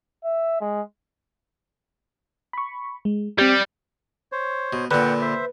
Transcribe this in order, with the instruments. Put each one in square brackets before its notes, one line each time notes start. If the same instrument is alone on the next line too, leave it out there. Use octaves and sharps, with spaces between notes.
[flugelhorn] E5
G#3
[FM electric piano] B5 C#6
G#3
[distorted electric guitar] G3 [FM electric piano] C4 G4
[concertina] C5 C#5
[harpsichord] B2
[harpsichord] A#2 D3 [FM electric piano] B4 [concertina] F#5 G5
[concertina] C5 E5